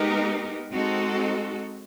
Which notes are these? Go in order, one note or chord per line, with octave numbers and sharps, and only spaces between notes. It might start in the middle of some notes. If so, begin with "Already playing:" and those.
Already playing: G#3 B3 D#4 G4 A#4
G#3 C4 D#4 F#4 A4